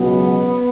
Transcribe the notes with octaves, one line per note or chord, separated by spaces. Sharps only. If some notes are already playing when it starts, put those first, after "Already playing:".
Already playing: C#2 B2 F#3 B3